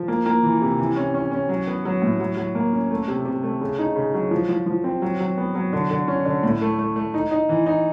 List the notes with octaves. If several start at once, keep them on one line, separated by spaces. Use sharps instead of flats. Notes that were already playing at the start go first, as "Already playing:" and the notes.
Already playing: F3
A#3
A#3
E3
C3
E3
C#4
C#4
C#4
F#3
B3
F#3
A2
F#3
F#3
A#3
C#4
A3
C3
C3
A3
C#3
D#4
C#3
F#3
F3
F3
F3
C4
F#3
F#3
B3
F#3
D3
D3
C#4
D3
A2
A3
A3
A3
D#4
D#4
E3
D#4